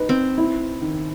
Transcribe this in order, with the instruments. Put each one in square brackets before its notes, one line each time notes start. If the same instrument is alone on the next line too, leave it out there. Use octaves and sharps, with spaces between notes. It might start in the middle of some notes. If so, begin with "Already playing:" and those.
Already playing: [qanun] D#4 [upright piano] B4
[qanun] C4
[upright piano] E4
D#3